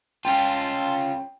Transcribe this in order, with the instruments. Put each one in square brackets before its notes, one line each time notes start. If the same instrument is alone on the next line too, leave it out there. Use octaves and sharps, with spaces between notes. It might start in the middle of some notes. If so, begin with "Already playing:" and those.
[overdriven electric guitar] C#4 F4 [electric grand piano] G5 [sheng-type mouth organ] A5 C6